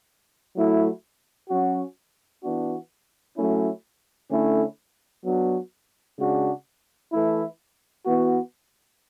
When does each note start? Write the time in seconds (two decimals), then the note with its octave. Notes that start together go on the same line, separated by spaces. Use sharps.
0.56 F#3 A3 E4
1.50 F#3 C#4 F#4
2.43 E3 B3 D4 F#4
3.37 F#3 A3 C#4 E4
4.31 D3 A3 C#4 E4
5.25 F#3 B3 D4 F#4
6.18 C#3 G#3 D4 F#4
7.12 E3 A3 E4
8.06 E3 B3 F#4